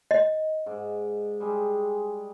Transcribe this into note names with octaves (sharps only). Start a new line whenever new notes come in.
D#5
G#2 D5
G3 G#3 G#4